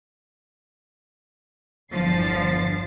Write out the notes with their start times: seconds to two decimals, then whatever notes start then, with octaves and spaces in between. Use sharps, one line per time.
1.93 G1 E2 D3 F3 A6 C7